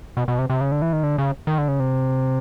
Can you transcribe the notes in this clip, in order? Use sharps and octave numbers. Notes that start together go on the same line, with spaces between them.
B2
B2
C3
C3
C#3
D3
E3
D#3
D3
C#3
D#3
D3
C#3
C3